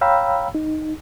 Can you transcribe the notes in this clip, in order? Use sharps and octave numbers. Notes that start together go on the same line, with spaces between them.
C#5 F5 G5 A#5 B5 E6
D#4